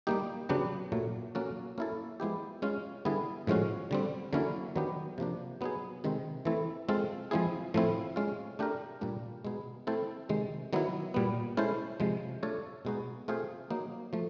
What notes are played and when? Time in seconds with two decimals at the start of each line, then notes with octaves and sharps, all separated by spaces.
0.07 G3 A#3 D#4 G4
0.49 C#3 F#3 B3 D4 G4
0.92 A#2 F#3 A3
1.35 F#3 A#3 C#4 F#4 A4
1.78 A#3 C#4 E4 A4
2.20 F3 G#3 B3 E4 G4
2.62 G#3 C#4 F4
3.05 D3 G3 B3 E4 G#4
3.47 A2 F3 G#3 C#4 F#4
3.91 D3 G3 C4
4.33 D3 F#3 A#3 C#4 E4
4.76 D#3 F#3 B3 D4 G4
5.18 C3 F3 A#3 D4
5.61 F#3 B3 D#4 G#4
6.04 C3 D#3 G#3 C4
6.45 E3 A3 C4 E4 A4
6.89 G#3 C4 F4 A4
7.31 F3 G#3 C4 E4 G#4
7.74 A2 F3 A3 C4 E4
8.16 G#3 C#4 F4
8.59 A3 D4 G4 A#4
9.01 A#2 G3 A#3 D4
9.45 B2 G#3 B3 D#4 G#4
9.87 A3 C4 E4 A4 C5
10.29 C3 D#3 G#3
10.73 D#3 F#3 B3 E4
11.14 A#2 G3 B3
11.57 G#3 C#4 E4 A4 C5
12.00 C3 F3 G#3
12.43 A3 D4 F4 A4 C#5
12.85 B2 G#3 B3 D#4 F#4
13.28 A3 C4 F4 G#4 C5
13.70 F#3 A#3 D#4
14.13 F3 A3